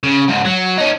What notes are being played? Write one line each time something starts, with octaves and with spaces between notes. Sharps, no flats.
C#3
C#2 G#2
F#3
C#4 D#4